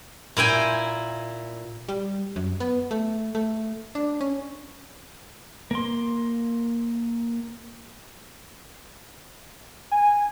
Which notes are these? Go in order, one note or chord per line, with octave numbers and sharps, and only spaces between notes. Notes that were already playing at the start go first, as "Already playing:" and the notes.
A#2 E4 G5 G#5
G3
F#2
B3
A3
A3
D4
C#4
A#3 C6
G#5